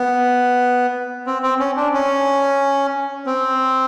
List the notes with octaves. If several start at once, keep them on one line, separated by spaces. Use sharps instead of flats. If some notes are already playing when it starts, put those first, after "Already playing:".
Already playing: B3
C4
C4
C#4
D4
C#4
C4